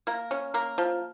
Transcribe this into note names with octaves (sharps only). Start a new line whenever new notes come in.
A#3 A#4
C#4
A#3 A#4
F3